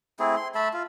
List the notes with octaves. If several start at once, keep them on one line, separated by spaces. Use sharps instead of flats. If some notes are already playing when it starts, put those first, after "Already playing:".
A3 C4 E4 G#4
C6
A3 E5 A5 B5
F4